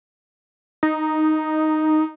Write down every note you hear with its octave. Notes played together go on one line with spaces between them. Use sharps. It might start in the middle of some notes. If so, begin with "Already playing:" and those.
D#4